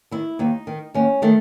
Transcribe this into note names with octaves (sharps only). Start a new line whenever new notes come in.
D#3 E4
D#2 D#4
D#3
D#2 C#4
D#3 A3